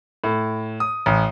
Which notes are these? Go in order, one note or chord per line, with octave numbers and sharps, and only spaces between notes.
A2
D#6
A1